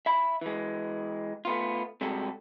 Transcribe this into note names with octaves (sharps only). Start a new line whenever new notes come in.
E5 B5
E3 G#3
A3 B3 F4
C3 G3 G#3 F#4 A4